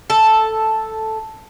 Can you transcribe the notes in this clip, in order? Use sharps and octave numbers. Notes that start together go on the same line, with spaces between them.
A4